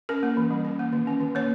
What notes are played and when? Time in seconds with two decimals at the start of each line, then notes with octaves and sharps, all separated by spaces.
0.09 C#4 A#4
0.23 A#3
0.37 E3
0.50 G3
0.65 C#4
0.79 A#3
0.93 D#3
1.07 C#4
1.21 D#3
1.35 A#3 C#5